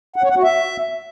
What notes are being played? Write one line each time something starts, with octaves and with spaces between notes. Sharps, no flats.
F#5
C#5
F#5
F#4
E5